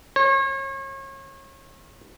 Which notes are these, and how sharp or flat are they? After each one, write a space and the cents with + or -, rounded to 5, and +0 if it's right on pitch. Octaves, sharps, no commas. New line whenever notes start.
C#5 -35